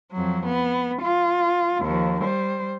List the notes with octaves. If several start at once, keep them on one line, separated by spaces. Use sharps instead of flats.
F2 F#3
B3
F4
D#2 F3
G3 C5